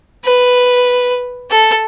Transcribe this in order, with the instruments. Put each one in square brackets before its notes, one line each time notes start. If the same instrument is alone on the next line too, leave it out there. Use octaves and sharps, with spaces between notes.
[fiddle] B4
A4